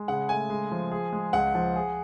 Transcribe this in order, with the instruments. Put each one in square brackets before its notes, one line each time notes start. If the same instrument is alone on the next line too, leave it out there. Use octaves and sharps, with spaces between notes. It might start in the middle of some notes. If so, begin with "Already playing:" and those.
Already playing: [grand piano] G#3
[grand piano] C#3 [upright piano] F#5
[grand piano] A3 [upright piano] G#5
[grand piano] G#3
F3
G#4
G#3
[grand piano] C#2 [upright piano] F#5
[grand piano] F3
G#4